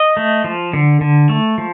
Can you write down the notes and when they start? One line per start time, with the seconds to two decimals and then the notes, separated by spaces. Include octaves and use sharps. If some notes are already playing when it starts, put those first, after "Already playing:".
Already playing: D#5
0.17 A3
0.44 F3
0.73 D3
1.01 D3
1.29 A3
1.58 F3